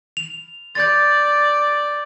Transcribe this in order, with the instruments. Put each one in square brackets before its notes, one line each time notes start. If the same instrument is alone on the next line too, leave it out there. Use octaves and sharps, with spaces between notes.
[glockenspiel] F7
[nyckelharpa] D5 [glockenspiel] G6 A6